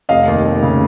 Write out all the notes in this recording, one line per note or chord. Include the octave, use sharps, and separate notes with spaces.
F1 D#5 F5
D#2
F1
C#3